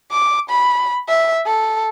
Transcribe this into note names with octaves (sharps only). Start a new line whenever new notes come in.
D6
B5
E5
A4